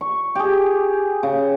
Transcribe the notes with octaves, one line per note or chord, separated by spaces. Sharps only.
C#6
G4 G#4
C#3